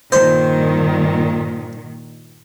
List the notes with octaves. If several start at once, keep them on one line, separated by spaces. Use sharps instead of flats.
G2 A#2 D#3 C5